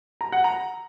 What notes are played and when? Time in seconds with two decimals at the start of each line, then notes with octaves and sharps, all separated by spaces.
0.21 A#5
0.32 F#5
0.44 A#5